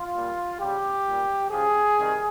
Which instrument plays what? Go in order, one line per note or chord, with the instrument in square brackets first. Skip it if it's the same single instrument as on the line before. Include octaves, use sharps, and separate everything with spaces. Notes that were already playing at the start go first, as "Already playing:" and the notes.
Already playing: [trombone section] F4
A#2 G3
C#3 G3 G4
A#2 G3
C#3 F3 G#4
C3 D#3 G3